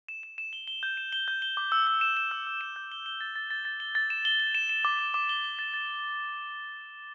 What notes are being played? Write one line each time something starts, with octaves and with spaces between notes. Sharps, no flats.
E7
E7
E7
G7
G7
G6
E7
G7
G6
G7
D6
E6
E6
E7
E7
E6
E6
E7
G6
G7
G7
A6
A6
A6
A6
G7
A6
E7
G7
G7
E7
E7
D6
D6
D6
G7
G7
A6
A6